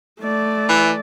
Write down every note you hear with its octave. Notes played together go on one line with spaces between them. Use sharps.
A3 D5
E3